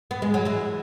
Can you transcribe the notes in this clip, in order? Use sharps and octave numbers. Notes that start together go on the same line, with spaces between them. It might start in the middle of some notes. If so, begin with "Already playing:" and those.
B3
G#3
F#3
E3 G#3